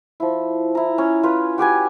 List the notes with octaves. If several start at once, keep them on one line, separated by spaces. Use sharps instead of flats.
F3 E4
E4 A#5
C#4
F4 B4
F#4 G4 B4 G#5